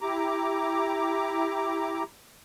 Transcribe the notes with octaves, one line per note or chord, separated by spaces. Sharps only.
E4 G4 A#5 D6